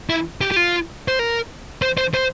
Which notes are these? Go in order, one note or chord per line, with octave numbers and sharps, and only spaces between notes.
E4
G4
G4
F4
C5
A#4
C5
C5
C5